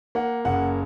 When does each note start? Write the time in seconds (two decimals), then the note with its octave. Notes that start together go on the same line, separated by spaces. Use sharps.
0.15 A#3 F#5
0.45 F#1 F#5